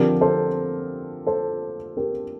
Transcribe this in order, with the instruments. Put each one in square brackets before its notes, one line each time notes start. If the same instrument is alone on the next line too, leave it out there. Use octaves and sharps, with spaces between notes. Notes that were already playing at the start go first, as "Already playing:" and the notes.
Already playing: [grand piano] D3 F3 C4 G4 A#4
A4 C5
A4 C5
G4 A#4